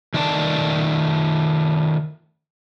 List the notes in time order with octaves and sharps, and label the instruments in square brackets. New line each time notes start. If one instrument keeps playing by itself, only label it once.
[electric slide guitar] D#3 A3 D5 A5